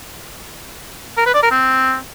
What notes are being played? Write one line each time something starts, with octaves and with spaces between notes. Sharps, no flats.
A#4
B4
D5
A#4
C4